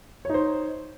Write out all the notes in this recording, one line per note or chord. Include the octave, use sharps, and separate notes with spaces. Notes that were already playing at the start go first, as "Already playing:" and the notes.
D#4 C5 C#5